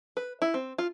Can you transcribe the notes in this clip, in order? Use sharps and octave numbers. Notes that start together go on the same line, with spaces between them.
B4
E4
C4
F4